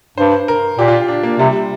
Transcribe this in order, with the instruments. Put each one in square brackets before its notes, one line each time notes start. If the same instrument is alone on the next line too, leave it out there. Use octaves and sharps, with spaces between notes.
[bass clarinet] G2 [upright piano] C5
[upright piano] A#4
[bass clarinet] A#2 [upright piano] G4
[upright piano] F4
D4
A#3
[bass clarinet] C3 [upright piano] G3